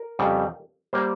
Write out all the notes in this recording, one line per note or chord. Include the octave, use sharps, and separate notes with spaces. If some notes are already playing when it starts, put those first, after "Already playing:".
Already playing: A#4
F2 C#3 G3
G3 A#3 C5